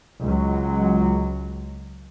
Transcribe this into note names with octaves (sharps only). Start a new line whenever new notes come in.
C#2 F#3